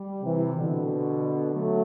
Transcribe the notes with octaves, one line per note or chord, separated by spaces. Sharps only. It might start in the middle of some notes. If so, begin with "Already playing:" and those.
Already playing: G3
C3 E3
B2 D3
F#3 A3